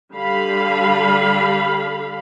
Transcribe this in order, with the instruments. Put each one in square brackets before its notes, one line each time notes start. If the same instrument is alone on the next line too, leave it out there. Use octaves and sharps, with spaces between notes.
[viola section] D3 G3 F5 B5